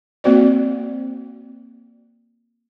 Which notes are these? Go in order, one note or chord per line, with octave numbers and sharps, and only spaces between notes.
A#3 C4 F#4 C5 D5